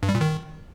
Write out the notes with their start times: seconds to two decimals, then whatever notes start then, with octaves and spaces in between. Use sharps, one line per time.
0.03 G2
0.09 G3
0.15 A#2
0.21 D#3